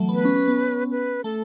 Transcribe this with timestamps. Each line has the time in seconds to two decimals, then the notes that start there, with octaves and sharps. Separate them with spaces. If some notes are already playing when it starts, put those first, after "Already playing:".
Already playing: E3 F#3 A3
0.09 B3
0.14 B4
0.25 C#4
0.36 C#4
0.48 B3
0.91 B4
1.24 A3 A4